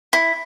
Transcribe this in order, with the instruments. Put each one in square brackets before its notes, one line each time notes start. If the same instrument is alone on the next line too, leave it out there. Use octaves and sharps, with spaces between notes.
[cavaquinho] E4